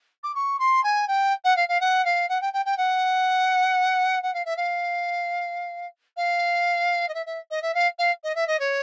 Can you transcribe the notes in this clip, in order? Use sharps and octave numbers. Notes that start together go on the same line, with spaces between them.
D6
C#6
C6
G#5
G5
F#5
F5
F5
F#5
F5
F#5
G5
G5
G5
F#5
F#5
F5
E5
F5
F5
D#5
E5
E5
D#5
E5
F5
F5
D#5
E5
D#5
C#5